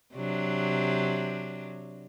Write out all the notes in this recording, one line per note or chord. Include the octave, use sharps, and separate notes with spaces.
C3 F#3 D4